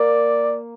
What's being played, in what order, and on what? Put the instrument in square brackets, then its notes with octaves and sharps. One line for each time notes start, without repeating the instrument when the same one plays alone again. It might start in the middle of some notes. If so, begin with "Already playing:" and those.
Already playing: [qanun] A#3 [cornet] D5